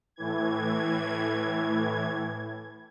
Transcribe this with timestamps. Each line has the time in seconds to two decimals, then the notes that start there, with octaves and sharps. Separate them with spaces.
0.16 A2 E3 G#6